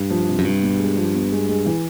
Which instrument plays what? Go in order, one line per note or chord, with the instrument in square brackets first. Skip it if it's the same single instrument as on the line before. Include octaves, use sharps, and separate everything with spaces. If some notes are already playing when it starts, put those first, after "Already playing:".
Already playing: [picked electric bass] G2
[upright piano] F3
C3
[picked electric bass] F#2
[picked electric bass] G2 [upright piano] G3
[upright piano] B2
G#3
F3
B3
G#3
G#3
E3